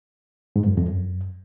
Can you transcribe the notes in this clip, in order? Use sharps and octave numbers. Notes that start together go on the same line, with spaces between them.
G#2
F#2
F2
F#2